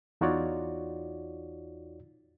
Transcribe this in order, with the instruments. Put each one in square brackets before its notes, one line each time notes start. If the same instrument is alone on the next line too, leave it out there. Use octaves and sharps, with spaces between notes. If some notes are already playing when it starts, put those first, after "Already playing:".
[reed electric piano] E2 D#4 F4 F#4 C#5 D5